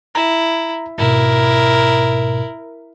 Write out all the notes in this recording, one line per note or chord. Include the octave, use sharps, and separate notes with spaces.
E4 A#5
G#1 G#2 B2 E4 A#4